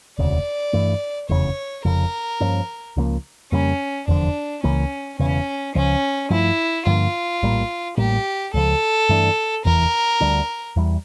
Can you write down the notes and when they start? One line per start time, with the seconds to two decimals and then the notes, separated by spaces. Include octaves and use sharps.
0.18 E1 D2 C#3 D5
0.73 G2 E3 A3
1.29 F1 E2 C#3 C#5
1.85 F1 F2 C#3 A#4
2.40 G2 F3 A#3 C#4
2.96 C#2 C#3 F3 A#3
3.52 F2 C#3 G3 A#3 C#4
4.08 F1 E2 D3 F3 D4
4.63 C#2 C#3 E3 A#3 C#4
5.19 E1 E2 C#3 E3 C#4
5.75 C#2 C#3 F3 C#4
6.30 G2 F3 A3 E4
6.86 G2 D3 F3 A#3 F4
7.43 A#1 A2 G3 A#3
7.98 A1 A2 G3 A#3 G4
8.54 C#2 C#3 F3 A4
9.09 G2 E3 A3 D4
9.65 F1 E2 E3 A#4
10.20 D2 D3 G3 D4
10.76 E2 E3 G3